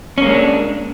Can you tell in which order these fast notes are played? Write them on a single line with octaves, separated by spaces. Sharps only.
C#4 A#3 G#3 D4